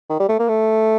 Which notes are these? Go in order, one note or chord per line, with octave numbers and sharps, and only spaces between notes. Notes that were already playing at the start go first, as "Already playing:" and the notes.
D#3
G3
A3
A#3
A3